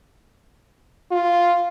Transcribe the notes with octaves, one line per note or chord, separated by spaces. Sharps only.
F4